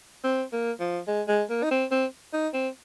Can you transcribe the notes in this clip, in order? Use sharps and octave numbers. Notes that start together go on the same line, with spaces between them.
C4
A#3
F3
G#3
G#3
A#3
D#4
C4
C4
D#4
C4